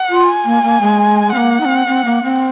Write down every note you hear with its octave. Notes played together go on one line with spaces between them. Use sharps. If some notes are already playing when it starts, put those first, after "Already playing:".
Already playing: F#5
F4
G#5
A#3
A#3
G#3
A#3 C4 F#5
D#4
C4
C4
A#3
C4